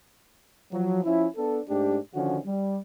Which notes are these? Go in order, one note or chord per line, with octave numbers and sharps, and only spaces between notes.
F3 F#3
F3 C#4 E4
B3 D4 A4
G#2 A3 D4 G4
D3 D#3 F3 C#4 F#4
G3